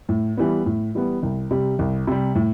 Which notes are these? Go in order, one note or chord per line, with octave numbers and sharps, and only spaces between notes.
A2
E3 G3 B3
A2
E3 G3 B3
C2
C3 G3
C2
C3 G3
A2